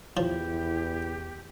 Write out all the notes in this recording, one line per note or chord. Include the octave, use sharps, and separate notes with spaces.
E2 F3 E4 G4